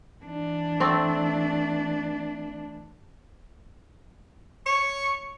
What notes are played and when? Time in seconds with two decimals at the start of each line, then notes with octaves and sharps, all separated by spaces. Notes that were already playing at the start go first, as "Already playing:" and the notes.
0.23 E3 D4
0.80 A3 C4 D5
4.66 C#5 C#6